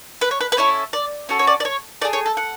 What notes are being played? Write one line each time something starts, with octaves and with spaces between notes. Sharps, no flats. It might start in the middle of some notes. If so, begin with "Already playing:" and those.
B4
C#5
B4
B4
C#4 E4 A4 C#5
D5
C#4 F#4 A4
C#5
D5
D5
C#5
A3 E4 G#4 D5
C#5
A4
F#5